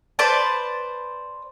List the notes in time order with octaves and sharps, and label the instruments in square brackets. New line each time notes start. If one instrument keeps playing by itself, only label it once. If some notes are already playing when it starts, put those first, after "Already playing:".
[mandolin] B4 C5 D5 A5